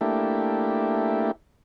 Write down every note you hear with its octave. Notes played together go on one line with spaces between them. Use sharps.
A3 A#3 D4 E4 G4